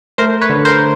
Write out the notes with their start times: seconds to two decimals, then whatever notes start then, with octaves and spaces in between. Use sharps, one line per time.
0.18 A3 A#4 C5
0.41 B4 C#5
0.49 D3
0.65 A#4 C5